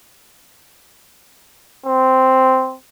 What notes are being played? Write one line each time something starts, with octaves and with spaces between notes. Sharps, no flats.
C4